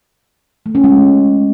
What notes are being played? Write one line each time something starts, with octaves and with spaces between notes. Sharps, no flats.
A3
C#4
G#3